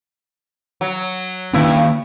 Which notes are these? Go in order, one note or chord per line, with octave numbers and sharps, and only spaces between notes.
F#3
G2 D#3 A#3 C#4 E4